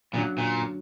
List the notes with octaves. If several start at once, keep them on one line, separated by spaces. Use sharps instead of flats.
F#2 A#2 D3 F#3
A#2